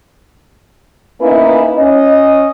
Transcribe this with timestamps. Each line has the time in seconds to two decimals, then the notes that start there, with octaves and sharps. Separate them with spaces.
1.21 A#3 B3 C#4 D#4 E4 B4
1.78 C#4 D#5